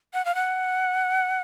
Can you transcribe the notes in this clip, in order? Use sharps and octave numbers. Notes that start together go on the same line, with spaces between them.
F#5
F5
F#5